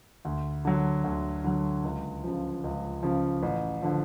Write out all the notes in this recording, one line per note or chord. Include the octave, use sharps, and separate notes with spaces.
D2
D3 F#3
D2
D3 F#3
C#2
C#3 F3
C#2
C#3 F3
A1
D3 F3